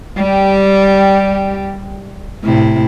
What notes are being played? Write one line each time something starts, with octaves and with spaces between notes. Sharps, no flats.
G3 G4
A2 C3 E4